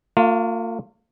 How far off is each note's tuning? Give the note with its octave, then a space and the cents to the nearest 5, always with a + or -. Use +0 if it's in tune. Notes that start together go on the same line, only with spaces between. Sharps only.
A#3 -45 F4 +20